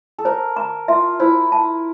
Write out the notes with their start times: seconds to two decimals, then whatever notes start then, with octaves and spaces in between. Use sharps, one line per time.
0.18 A4
0.25 A#4 C5
0.57 A#5
0.88 F4 E5
1.20 E4 C5
1.52 A5